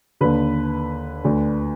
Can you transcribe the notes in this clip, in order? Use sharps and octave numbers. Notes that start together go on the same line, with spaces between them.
D#2 D3 B4
D2 D3